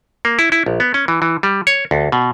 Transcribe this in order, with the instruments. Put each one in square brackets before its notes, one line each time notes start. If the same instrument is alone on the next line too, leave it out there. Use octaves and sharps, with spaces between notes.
[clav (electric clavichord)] A#3
E4
E4
A#1
B3
C#4
E3
E3
G3
C#5
D2
B2